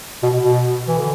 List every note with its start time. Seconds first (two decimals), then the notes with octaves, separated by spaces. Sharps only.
0.22 B2
0.42 B2
0.88 E3
0.98 D3